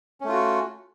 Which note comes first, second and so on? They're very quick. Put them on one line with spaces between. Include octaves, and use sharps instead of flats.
C#4 A3 F4 F#4